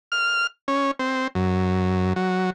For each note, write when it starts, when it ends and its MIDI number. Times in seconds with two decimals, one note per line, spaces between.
0.12 0.47 89
0.68 0.91 61
0.99 1.28 60
1.35 2.13 42
2.16 2.50 54